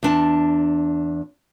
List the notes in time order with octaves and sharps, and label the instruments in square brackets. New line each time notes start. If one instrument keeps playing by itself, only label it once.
[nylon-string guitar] E2 D4 A5